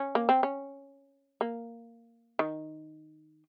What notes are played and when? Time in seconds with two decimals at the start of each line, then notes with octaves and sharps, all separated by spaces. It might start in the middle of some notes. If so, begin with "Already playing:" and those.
Already playing: C#4
0.15 A#3
0.29 C4
0.43 C#4
1.41 A#3
2.39 D#3